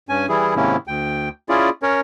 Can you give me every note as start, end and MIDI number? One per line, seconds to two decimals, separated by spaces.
0.09 0.26 43
0.09 0.26 61
0.09 0.26 80
0.29 0.54 52
0.29 0.54 55
0.29 0.54 64
0.29 0.54 68
0.56 0.76 44
0.56 0.76 48
0.56 0.76 51
0.56 0.76 58
0.56 0.76 61
0.56 0.76 64
0.87 1.29 38
0.87 1.29 79
1.49 1.70 61
1.49 1.70 64
1.49 1.70 65
1.49 1.70 68
1.49 1.70 74
1.82 2.01 61
1.82 2.01 70
1.82 2.01 73